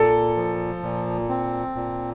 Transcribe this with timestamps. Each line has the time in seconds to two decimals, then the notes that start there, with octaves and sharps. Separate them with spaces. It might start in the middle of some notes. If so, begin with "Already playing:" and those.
Already playing: A#2 A4
0.37 F3
0.83 A#2
1.29 C4
1.75 A#2